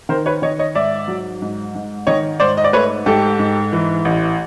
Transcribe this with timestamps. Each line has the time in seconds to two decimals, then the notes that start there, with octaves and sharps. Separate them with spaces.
0.09 D#3 A#4 C5
0.26 B4 C#5
0.42 D#3 C#5 D#5
0.59 C#5 D#5
0.75 G#2 D5 E5
1.08 F#3
1.42 G#2
1.75 G#2
2.07 D#3 C#5 D#5
2.40 G#2 C5 D5
2.57 D#5
2.64 D5
2.73 A3 B4 C#5
3.06 G#2 G4 A4
3.39 G#2
3.73 E3
4.05 A1